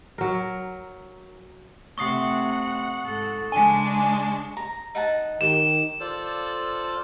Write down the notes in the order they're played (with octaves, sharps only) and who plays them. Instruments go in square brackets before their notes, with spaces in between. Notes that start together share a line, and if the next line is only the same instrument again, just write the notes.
[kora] F#3 A#4
[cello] C3 A3 [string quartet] F#5 [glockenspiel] C#6 D#6 C7
[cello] G#2 A4
[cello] C#3 [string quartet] G#3 D4 [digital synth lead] G#5
[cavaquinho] A#5
D#4 F#5 A5
[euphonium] D#3 [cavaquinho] G4 [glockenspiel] E7
[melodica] F4 A4 C5 D5